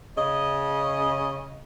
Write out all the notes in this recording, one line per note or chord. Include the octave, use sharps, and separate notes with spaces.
C#3 D#5